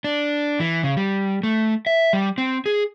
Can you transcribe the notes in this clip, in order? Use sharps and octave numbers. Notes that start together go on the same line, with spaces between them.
D4
E3
C#3
G3
A3
E5
G3
C4
G#4